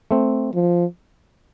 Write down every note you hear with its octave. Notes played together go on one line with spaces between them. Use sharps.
A3 C4
F3